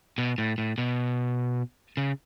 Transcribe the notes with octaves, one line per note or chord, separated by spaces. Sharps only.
B2
A2
A2
B2
C#3